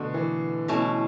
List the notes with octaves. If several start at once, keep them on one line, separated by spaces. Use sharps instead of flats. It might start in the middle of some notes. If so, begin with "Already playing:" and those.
Already playing: B2 D3 A3 D4 A4
E3
B2 A3 C#4 E4